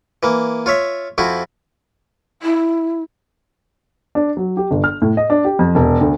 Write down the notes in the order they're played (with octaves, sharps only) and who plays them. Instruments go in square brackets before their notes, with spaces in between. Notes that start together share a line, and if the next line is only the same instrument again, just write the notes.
[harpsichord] E3 A#3
F4 C#5 E5
F2 F3 E4 F#4
[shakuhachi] E4
[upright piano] D4
F#3
G4
G1
F6
A2
D#5
D4
G4
F2
E1
D2